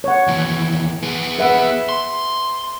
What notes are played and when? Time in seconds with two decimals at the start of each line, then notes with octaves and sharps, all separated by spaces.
0.04 C#5 F#5
0.28 D#2 E3
1.03 B3 G#4
1.39 B4 E5 F#5
1.89 C6